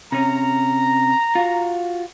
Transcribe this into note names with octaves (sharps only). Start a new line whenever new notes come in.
C3 C#4 A#5
F4 F#4